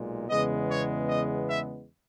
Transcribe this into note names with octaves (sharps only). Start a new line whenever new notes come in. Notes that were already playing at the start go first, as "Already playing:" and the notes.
Already playing: B1 A#2 G#3
E2 C#3 G#3 B3 D#5
C#5
D#5
E5